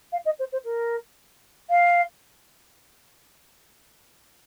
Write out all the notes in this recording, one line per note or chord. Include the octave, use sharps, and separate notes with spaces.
F5
D#5
C5
C5
A#4
F5